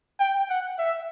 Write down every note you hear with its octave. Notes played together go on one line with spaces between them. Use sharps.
G5
F#5
E5